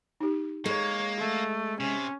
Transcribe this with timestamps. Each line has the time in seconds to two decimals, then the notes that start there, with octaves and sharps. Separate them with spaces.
0.20 D#4 G4
0.66 G#3 A#3 A4 C#5
1.18 A3
1.80 C3 C#4